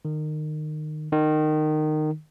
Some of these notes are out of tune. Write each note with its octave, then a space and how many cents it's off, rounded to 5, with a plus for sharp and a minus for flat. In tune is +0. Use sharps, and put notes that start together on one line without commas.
D#3 -25
D#3 -20